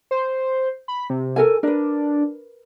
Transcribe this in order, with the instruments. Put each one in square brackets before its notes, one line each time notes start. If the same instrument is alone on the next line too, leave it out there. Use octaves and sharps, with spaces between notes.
[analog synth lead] C5
B5
C3
[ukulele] A4 A#4 G#5
[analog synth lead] D4 [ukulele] A#4 B4